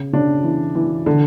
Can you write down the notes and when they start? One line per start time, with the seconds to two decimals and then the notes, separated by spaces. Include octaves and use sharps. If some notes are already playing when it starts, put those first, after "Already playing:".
Already playing: C#3
0.13 C#3 D4
0.44 E3
0.75 E3
1.06 D3